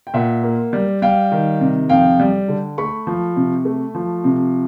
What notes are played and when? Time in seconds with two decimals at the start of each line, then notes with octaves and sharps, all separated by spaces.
0.07 G5
0.14 A#2 E5 F#5
0.43 A#3
0.73 G3
1.02 G3 F5 G5
1.32 D#3
1.61 C3
1.89 F2 F5 G5
2.20 G3
2.48 D3
2.78 A3 B5 C#6
3.07 F3
3.36 C3
3.65 A3
3.95 F3
4.24 C3